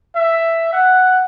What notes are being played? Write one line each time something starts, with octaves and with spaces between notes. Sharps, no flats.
E5
F#5